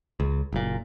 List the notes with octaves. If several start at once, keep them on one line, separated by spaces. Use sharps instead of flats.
C#2
F#1 A#2